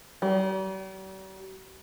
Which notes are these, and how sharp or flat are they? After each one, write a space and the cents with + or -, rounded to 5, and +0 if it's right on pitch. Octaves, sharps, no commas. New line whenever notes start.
G3 -45